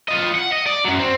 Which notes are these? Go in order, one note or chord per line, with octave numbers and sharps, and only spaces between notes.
F4 D#5
F#5
D#5
D5
F#2 F#3
C4